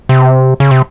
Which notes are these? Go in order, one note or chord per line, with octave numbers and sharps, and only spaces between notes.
C3
C#3
C3